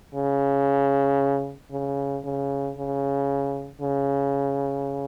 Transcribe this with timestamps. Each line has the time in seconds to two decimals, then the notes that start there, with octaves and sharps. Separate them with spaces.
0.15 C#3
1.72 C#3
2.24 C#3
2.77 C#3
3.81 C#3